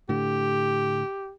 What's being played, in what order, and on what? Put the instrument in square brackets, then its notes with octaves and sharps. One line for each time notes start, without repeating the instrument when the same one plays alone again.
[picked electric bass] A2 D3 [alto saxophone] G4